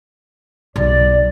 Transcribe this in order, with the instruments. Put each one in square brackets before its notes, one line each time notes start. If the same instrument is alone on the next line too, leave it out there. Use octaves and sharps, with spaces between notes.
[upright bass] B1 [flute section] D5